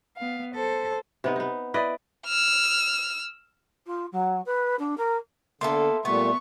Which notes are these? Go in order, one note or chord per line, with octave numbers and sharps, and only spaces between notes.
B3 F5
A4 C5
C3 B3 D#4
B3 D#4
E4 B4 D5 D#5
E6 F6
F4
F#3
B4
D4
A#4
D3 A#3 B3 A4 E5 C6
A#2 G3 A3 B3 C#6